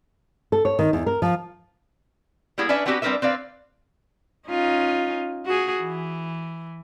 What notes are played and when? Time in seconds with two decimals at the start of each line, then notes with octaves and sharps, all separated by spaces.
0.52 A4
0.65 C#5
0.79 D#3
0.93 E2
1.06 A#4
1.22 F3
2.58 G3 A#3 B3 E4 G#4
2.69 C#4 D4 B4 D5 E5
2.86 B3 C4 D4 F#4 G4 B4
3.02 G3 C4 D4 A#4 B4 E5
3.22 C4 B4 D5 F5
4.48 C#4 D#4 F4
5.45 F#4 G#4
5.78 E3